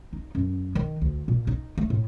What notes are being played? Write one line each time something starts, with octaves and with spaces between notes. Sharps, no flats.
D#4
F#2
D#3
D2
A#2
D#4
A3
A2